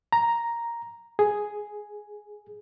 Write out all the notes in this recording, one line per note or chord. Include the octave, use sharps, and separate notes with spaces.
A#5
G#4